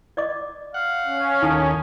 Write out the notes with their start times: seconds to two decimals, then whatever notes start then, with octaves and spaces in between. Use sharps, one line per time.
0.17 D5 D#5 D6
0.74 F5 F#5
1.06 C#4
1.42 D#2 D#4 A4 A5